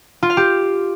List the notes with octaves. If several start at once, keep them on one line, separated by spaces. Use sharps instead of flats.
F4
F5
G4